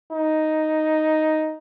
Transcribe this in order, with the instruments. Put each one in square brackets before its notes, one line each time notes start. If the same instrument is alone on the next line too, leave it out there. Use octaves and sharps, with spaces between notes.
[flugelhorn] D#4